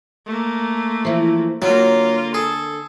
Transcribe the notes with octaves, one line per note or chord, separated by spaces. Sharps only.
A3 A#3
E3 F3
D3 F#3 A#3 F4
G#4 A4